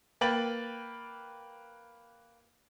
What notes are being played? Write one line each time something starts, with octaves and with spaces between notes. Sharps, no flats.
A#3 B4 G5 B5 A6 F#7